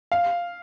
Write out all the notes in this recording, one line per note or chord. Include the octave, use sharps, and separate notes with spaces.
F5